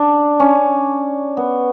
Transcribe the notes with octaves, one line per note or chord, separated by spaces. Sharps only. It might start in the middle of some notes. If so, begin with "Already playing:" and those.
Already playing: D4
C#4
B3